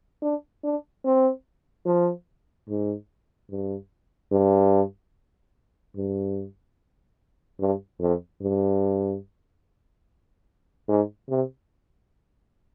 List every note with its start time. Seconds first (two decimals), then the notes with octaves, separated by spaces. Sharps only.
0.22 D4
0.63 D4
1.05 C4
1.86 F3
2.69 G#2
3.50 G2
4.32 G2
5.96 G2
7.60 G2
8.00 F2
8.42 G2
10.88 G#2
11.29 C3